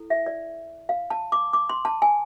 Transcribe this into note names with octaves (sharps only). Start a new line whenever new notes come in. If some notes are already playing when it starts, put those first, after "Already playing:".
Already playing: E4 A4
E5
D5
F5
A5
D6
D6
C6
A5
G#5